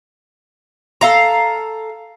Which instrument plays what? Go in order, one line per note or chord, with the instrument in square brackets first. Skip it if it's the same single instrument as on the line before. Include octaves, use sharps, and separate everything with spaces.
[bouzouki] A4 F5 A#5